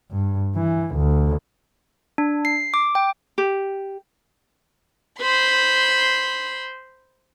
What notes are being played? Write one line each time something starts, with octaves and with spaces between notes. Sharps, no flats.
G2
E3
D2
D4
C7
D6
G5
G4
C5 B5 C6